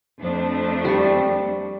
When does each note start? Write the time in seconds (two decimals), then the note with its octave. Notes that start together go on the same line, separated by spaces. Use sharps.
0.21 F2 F3 A3 D4
0.85 G3 C#6